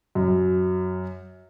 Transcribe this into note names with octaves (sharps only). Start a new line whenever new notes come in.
F#2